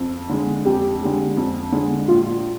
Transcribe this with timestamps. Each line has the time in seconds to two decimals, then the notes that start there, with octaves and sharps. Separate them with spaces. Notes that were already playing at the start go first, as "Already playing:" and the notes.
Already playing: F2
0.29 D3 G#3
0.65 F2 G4
1.01 D3 G#3
1.37 F2
1.72 D3 G#3
2.08 A#1 F4